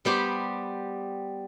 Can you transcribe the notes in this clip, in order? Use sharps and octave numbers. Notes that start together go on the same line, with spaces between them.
G3 B3 G4 C5